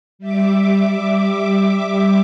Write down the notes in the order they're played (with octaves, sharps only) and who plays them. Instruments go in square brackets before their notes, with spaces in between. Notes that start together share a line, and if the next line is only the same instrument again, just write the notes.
[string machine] G3 E5 D6